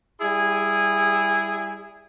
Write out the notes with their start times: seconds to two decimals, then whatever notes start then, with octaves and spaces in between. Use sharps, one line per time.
0.21 G3 E4 G#4 G#5